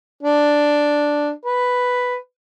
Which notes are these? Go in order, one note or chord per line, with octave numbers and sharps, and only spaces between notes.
D4
B4